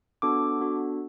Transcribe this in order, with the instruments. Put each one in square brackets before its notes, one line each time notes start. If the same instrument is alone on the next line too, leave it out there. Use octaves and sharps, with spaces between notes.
[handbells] B3 D4 F#4 A4 D6
B3 D4 F#4 A4